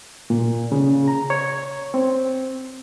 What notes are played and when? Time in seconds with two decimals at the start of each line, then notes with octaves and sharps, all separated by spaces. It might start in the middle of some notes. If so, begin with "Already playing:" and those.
0.30 A#2
0.72 C#3
1.08 A#5
1.30 C#5
1.94 C4